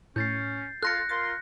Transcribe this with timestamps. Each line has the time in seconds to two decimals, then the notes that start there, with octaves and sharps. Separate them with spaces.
0.16 A2 C#4 G6 A6 C7
0.83 F4 A4 C6 F#6 A#6 C#7
1.09 F4 A#4 C6 A6